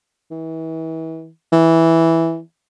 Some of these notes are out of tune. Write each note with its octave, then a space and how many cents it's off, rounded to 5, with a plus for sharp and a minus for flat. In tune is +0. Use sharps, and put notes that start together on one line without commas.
E3 -35
E3 -5